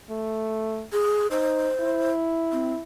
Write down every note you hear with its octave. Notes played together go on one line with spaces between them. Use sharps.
A3
G#4
D#4 C5
E4
C4